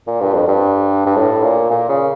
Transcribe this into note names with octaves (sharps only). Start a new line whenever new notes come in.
A#2
G2
F2
G2
G2
A2
A#2
A#2
C#3